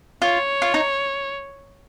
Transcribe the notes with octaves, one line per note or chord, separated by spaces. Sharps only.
F4 C#5
F4
D#4